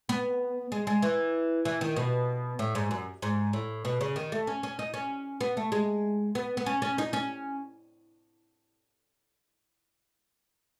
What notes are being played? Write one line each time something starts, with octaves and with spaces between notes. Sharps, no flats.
B3
G#3
G#3
E3
E3
D#3
B2
A2
G#2
F#2
G#2
A2
B2
C#3
D#3
A3
C#4
C#4
D#4
C#4
B3
A3
G#3
B3
B3
C#4
C#4
D#4
C#4